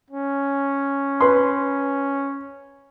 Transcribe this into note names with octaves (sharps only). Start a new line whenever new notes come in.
C#4
B4 C6